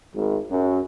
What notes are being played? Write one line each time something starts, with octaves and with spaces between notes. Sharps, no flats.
G#1
F#2